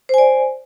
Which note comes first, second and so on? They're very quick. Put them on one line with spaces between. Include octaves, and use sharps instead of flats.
C5 G#5 D5